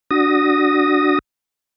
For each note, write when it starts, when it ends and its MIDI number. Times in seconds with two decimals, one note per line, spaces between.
0.11 1.19 62
0.11 1.19 66
0.11 1.19 87
0.11 1.19 94